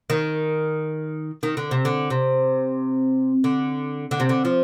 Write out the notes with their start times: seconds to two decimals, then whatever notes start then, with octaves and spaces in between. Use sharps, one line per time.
0.10 D#3
1.43 D#3
1.57 D3
1.71 C3
1.85 D3
2.10 C3
3.44 D3
4.11 D3
4.20 C3
4.29 D3
4.45 F3